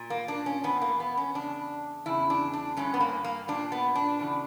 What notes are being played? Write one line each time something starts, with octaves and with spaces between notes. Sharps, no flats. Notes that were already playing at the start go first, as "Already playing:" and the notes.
Already playing: A#2
A#3
D4
C#4
E2 B2 B3
A#3
B3
C#4
E2 C#3 D4
E2 C#3 E4
D4
D4
G2 D3 C#4
B3
A#3
A#3
A#2 D4
B3
D4
E2 C#3 E3